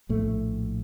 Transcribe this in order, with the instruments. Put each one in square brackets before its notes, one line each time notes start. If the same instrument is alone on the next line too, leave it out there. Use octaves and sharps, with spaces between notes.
[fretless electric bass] A#1 A2 A3